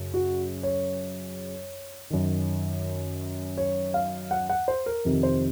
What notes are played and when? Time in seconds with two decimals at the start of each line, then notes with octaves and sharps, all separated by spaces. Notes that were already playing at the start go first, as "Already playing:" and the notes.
Already playing: F#2 C#3
0.14 F#4
0.63 C#5
2.10 F#2 D#3
3.58 C#5
3.94 F5
4.31 F#5
4.50 F#5
4.68 C5
4.86 A#4
5.05 F2 C3 D#3
5.23 C5